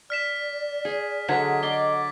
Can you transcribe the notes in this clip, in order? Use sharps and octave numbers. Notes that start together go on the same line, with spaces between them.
D5 F6 B6 E7
G#4
D3 F#3 G#3 G#6 B6
A4 D5 D#5 C6